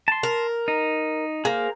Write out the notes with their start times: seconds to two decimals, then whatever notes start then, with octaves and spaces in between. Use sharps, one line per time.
0.08 A5 C6
0.23 A#4
0.68 D#4
1.45 A#3 G#4 A#4 C5